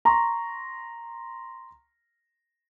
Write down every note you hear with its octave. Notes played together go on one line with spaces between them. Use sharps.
A#5 C6 C#6